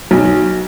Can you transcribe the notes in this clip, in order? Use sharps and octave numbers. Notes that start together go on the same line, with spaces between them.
B1